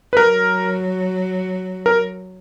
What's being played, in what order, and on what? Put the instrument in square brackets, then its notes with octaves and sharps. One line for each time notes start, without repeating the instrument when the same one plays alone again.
[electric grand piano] B4
[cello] F#3 [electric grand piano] A#4
[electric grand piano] A#4